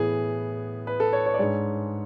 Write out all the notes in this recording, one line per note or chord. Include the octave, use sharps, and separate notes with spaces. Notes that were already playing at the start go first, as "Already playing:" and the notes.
Already playing: A2 E3 B3 G#4
B4
A4
C#5
C#5
D5
G#2 G#3 D4 C#5